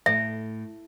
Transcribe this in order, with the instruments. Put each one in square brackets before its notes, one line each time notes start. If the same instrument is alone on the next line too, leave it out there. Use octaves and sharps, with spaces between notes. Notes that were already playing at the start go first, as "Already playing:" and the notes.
[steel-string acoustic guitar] A2 [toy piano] E5